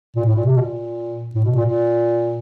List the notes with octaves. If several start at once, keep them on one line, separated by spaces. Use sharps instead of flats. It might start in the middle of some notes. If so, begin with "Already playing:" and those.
A#2
A2
A#2
C3
B2
A#2
A2
B2
A#2
A#2